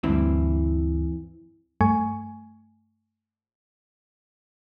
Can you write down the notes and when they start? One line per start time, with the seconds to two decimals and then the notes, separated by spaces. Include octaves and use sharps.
0.03 D2 G2 E3 C4 E4
1.81 G2 A3 G#5 C#6